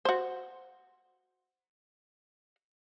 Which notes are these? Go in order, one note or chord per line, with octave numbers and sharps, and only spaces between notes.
F#4 C5